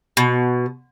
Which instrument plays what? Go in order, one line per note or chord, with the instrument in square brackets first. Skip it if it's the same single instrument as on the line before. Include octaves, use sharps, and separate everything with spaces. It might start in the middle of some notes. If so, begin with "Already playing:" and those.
[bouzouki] B2